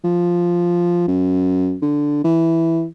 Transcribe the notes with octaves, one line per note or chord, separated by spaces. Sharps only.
F3
F#2
D3
E3